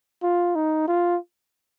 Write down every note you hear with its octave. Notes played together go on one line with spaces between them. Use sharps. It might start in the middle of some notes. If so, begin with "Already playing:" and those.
F4
D#4
F4